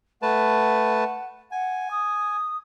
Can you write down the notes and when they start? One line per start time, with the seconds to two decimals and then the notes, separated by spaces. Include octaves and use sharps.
0.22 A3 B4 F#5 A5
1.52 F#5 G#5
1.91 D#6